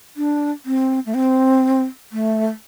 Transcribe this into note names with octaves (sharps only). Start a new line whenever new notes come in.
D4
C4
A3
C4
A3